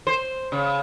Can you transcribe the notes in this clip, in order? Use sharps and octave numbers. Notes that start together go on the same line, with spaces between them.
C5
C#3